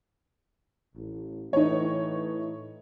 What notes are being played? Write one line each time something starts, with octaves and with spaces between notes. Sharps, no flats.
A1
A2 E3 D#4 C#5